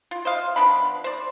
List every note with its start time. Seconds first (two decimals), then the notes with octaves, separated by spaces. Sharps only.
0.11 F4
0.25 C5 D#5 F5
0.56 F3 B3 D4 B5
1.04 C5 D5